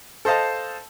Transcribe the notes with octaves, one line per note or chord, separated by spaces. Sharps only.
A4 C5 D#5 F5 A5